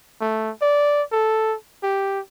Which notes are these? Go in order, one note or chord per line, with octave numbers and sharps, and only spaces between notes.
A3
D5
A4
G4